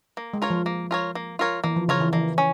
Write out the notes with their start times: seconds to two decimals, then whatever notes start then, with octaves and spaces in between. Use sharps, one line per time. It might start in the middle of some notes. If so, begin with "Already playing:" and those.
0.17 A#3
0.34 G#3
0.42 F4 A#4 C#5
0.50 F3
0.66 A#3
0.91 F4 A#4 C#5
1.15 A#3
1.39 F4 A#4 C#5
1.64 E3 A#3
1.76 F3
1.88 C#3 F4 A#4 C#5
2.00 E3
2.13 E3 A#3
2.38 C#4